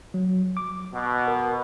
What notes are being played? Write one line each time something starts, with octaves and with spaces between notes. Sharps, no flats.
F#3
D6
B2
A#4